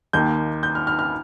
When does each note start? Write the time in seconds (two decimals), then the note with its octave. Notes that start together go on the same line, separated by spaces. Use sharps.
0.13 D#2 D#3 A#3 G6
0.63 G6
0.75 F6
0.87 F6
0.99 F6